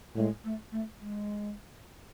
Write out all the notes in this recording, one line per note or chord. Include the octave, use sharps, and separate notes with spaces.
A2 G#3
A3
A3
G#3